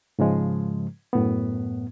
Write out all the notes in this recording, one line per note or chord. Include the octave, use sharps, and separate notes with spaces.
G#2 C#3 F3 G#3
F#2 A2 B3